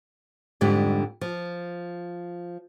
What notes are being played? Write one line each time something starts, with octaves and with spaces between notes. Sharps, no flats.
F2 G#2 D3 G3
F3